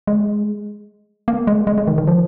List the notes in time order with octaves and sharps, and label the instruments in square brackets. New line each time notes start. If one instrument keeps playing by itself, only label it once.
[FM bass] G#3
A#3
G#3
G#3
G#3
D#3
D#3
F3